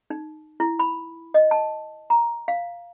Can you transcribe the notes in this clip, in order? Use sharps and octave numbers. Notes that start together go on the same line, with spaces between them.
D#4
E4
B5
D#5
A5
A#5
F5